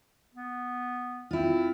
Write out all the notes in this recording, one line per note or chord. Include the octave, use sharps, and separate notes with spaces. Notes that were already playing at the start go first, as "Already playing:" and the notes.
B3
C4 E4 F4